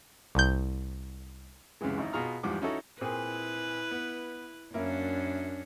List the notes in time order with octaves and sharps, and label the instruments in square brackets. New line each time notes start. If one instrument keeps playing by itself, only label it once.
[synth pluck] C2 G6
[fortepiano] C#2 F#2 C3 E3 G#3
G#1 D#4 E4
B2 F4 G#4 A#5 F6
E2 G#2 F3 G3 D6
C#4 D#4 E4 F#4 A4
[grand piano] A#2 C4 G#4 [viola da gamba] E4 B4
[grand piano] B3
[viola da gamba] F#2 C#4 D4 [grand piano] A#3 E4